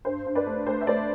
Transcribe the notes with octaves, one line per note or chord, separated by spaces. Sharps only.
G2 C5
G2
B4 D5
A3
A3 C5
E5
A3 B4 D5